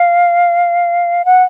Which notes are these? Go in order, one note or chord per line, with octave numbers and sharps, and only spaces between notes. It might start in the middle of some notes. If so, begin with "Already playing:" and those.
Already playing: F5
F#5